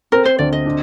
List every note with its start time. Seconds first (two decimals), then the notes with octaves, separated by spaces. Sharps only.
0.12 C4 A#4
0.25 C5
0.39 D2 D5
0.53 D#5
0.66 D4